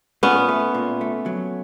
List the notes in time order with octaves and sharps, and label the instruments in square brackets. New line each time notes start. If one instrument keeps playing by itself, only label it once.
[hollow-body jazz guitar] A#2 [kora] B3 C#4
[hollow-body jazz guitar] A3
A#2
A3
F#3